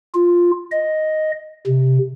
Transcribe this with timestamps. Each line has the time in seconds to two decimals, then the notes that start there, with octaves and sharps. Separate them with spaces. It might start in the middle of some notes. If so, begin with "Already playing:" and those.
0.14 F4
0.72 D#5
1.66 C3